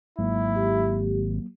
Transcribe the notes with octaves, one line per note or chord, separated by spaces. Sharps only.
G#1 F#3 A#3 E4
G4